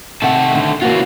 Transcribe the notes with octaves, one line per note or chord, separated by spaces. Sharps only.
C3 D#3 A3 F#5 A5
D3
C#3 E3 A#3 B3 F4 F#4